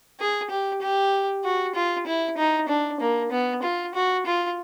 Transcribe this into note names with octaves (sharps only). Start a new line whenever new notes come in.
G#4
G4
G4
F#4
F4
E4
D#4
D4
A#3
B3
F4
F#4
F4